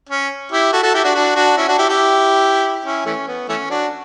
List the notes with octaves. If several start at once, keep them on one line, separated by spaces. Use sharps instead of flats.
C#4
E4 G4
F#4 A4
F#4 A4
E4 G4
D4 F#4
D4 F#4
D4 F#4
C#4 E4
D4 F#4
E4 G4
E4 G4
C#4 E4
E3 A3 C#4
B3
E3 A3 C#4
D4 F#4